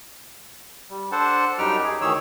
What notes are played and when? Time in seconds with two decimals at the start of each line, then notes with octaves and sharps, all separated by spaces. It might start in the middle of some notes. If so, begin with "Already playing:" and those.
0.90 G3
1.12 D4 A4 C5 F#5 A5
1.58 F#2 G3 D#4 G4 G5 F6
1.83 G#4
2.01 D2 D#3 E3 G#4 C#5 E6